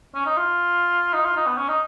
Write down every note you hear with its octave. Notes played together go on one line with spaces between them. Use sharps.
C#4
D#4
F4
D#4
F4
D#4
B3
C#4
D#4